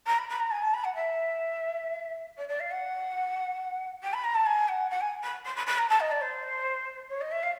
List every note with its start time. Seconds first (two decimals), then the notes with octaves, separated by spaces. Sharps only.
0.06 A#5
0.18 B5
0.29 B5
0.39 A#5
0.51 G#5
0.62 A5
0.73 B5
0.84 F#5
0.95 E5
2.37 D5
2.48 D5
2.59 F5
2.70 F#5
4.02 G5
4.13 B5
4.24 A#5
4.34 A5
4.45 G#5
4.68 F#5
4.90 F#5
5.00 G#5
5.23 B5
5.45 C6
5.56 B5
5.66 B5
5.78 A#5
5.89 A5
6.00 D#5
6.11 D5
6.21 C5
7.09 C#5
7.21 D#5
7.31 E5
7.43 F5